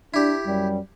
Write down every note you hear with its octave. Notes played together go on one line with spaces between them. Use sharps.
D4 E4 G4
F#2 G3